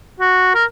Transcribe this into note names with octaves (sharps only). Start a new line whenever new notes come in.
F#4
A#4